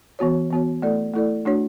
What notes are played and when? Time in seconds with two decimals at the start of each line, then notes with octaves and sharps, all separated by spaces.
0.19 E3 B3 F#4 C#5
0.50 E3 B3 F#4 C#5
0.82 A3 E4 A4 D5
1.14 A3 E4 A4 D5
1.45 A3 D4 F#4 C#5